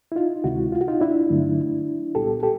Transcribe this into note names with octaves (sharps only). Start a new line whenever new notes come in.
E4
D#4 F4
D2 C3 D#3 G#3 C4 E4 F#4
F4
F#4
D#4 F4
D4 E4
G2 D3 F#3 A3
C2 A#2 G3 B3 G4 A4
G4 A4